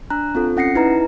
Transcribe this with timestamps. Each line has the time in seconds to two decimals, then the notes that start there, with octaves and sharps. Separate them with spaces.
0.10 D4 A#5 F#6
0.35 C4 F4 A4
0.57 C#4 F#5 A#6 C7 C#7
0.75 D#4 E4 B4 A#5